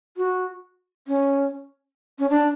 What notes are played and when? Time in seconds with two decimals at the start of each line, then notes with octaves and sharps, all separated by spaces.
0.17 F#4
1.08 C#4
2.19 C#4
2.30 D4